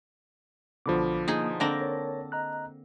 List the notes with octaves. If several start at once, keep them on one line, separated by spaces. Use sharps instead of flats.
B1 B2 D3 F3 B5 D6
A#3 D#4 G#4
D3 A#3 C4 D5 A5 A#6
A#4 C#5
D#5 A#5 F#6